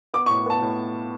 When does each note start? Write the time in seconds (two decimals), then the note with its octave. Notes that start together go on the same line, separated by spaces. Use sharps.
0.14 B3 D6
0.26 C#6
0.29 A2
0.46 B3 A5
0.62 A2